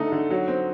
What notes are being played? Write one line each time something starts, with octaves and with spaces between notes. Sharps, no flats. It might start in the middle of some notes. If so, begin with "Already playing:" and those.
Already playing: D3 A3 D#4
D3
F#3
C4